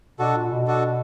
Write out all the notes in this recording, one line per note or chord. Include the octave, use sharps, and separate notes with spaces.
B2 D4 F#4 A4
A#2
B2
D4 F#4 A4